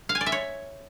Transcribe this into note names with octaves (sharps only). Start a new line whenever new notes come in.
F5
G#5
D5
E5
C#5